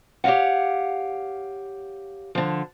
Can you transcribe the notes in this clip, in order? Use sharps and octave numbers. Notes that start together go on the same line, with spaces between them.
G4 C#5 D#5 F5 F#5
D3 F3